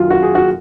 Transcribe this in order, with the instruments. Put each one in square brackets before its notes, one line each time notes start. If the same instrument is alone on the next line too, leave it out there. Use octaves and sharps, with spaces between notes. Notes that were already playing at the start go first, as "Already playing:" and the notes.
Already playing: [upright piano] F#2 D#3 F#3 F4
F#4
G#4
F#4